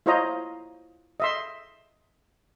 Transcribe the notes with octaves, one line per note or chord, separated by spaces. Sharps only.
E4 F4 C5 C#5 D#5 A#5
D#5 E5 C6